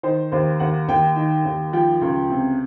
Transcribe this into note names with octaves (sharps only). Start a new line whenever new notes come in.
D#3 C5
D#2 C5
D#2 F#5
D#2 G5
D#3
D#2
F3 G5
C#2
C3